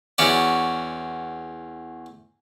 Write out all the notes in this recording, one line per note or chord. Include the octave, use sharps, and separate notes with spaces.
E2 C#4 F#4 D5